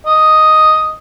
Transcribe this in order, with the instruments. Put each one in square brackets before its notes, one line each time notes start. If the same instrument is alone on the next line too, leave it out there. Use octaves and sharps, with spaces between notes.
[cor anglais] D#5